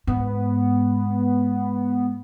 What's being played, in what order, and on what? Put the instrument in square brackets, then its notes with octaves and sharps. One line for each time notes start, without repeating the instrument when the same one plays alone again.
[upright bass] G#2 [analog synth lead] B3